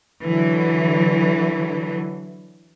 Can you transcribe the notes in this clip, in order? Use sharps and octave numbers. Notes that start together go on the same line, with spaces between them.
D3 E3 F#3